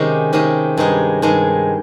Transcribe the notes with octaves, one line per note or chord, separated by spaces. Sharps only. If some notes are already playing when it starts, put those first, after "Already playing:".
Already playing: C3 D#3 G#3 C#4 G4
C3 D#3 G#3 C#4 G4
G2 D#3 G#3 D#4
G2 D#3 G#3 D#4